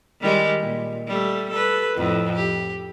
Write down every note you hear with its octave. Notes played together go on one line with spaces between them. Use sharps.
D#3 G3 G#3
A#2
G3 A3
A4 B4
F2 A2
G4